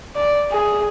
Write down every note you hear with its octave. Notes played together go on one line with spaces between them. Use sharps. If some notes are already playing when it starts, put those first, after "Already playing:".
D5
G#4